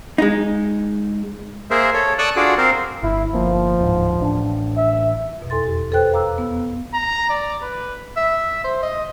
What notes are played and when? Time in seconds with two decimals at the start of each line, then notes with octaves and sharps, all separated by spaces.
0.18 G#3 D#4
1.71 A#3 G#4 A#4 C5 E5
1.94 A4 C#5
2.19 A4 D5 C#6 D#6 E6 F#6
2.36 D4 F4 F#4 G#4 A4 D5
2.58 C4 A#4 C5 F5
3.03 G1 E4
3.34 G1 F3 A#3
3.79 D1 G#2
4.19 A1 D4
4.77 E5
5.38 F2 B2
5.50 E2 A4 C6 A6
5.67 G4
5.92 A4 B4 C5 G5 F#6
6.13 F5 A#5 D6 E6
6.38 B3
6.94 A#5
7.30 D5
7.63 B4
8.17 E5
8.64 C5
8.83 D#5